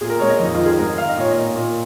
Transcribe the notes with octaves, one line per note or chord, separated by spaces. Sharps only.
A#2 G#4
A#4
G#3 C#5
D#5
F2 D#4
D#3 F4
G#4
G#2 A#4
D#3 F5
D#5
A#2 C#5
D#5
A#3
A#2